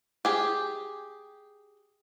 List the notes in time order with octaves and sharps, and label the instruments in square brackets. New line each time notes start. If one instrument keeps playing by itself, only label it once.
[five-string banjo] G4 G#4